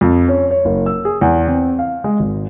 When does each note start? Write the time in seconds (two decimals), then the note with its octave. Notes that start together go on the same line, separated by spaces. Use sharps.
0.01 F2
0.28 C#4
0.51 C#5
0.65 F#1
0.86 E6
1.05 G#4
1.21 E2
1.48 C4
1.79 F5
2.04 G#3
2.19 G#1